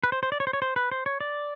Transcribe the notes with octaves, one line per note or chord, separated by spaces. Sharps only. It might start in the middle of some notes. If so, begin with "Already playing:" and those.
B4
C5
C5
D5
C#5
C5
C#5
C5
B4
C5
C#5
D5